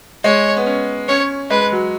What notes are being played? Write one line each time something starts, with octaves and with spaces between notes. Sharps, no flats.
G#3 C#5
B3
C#4
C#4 C#5
G#3 B4
F#3